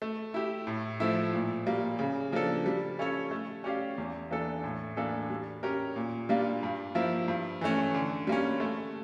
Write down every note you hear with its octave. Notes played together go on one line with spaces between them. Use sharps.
A3
E4 G4
A2
F3 A3 E4
A#2
G3 A#3
C#3
F3 A#3 D4 A4
G3
C#4 F4 A4 C#5
A3
C#4 G4 D5 F5
E2
E3 A#3 D4 A4
A2
E3 A#3 D4 A4
G3
C#4 G4 A#4
A#2
G3 A#3 D4 F4
G2
F3 A#3 E4
G2
E3 A3 C#4
D3
G3 A#3 C#4
A3